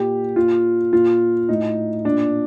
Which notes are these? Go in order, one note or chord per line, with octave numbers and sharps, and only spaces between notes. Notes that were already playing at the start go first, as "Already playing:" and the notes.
Already playing: A#2 G4
A#2 F4
A#2 F4
A2 D#4
A#2 D4